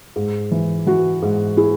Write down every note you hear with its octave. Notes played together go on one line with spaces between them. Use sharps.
G#2
E3
E3 F#4
G#2
E4 G#4